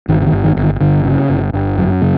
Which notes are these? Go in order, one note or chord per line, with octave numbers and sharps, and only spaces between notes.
G1 D#3
D3
D#3
G1
D#3
G1
D#3
G1 D3
C#3
G1
G1
F#2
C#3